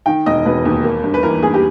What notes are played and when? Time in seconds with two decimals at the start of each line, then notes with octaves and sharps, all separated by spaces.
0.06 D#3 G5
0.26 E1 D#5
0.45 E1 B4
0.65 D#2
0.84 A#3
1.04 G2
1.14 B4
1.23 E3 A#4
1.43 G2 G#4
1.54 G4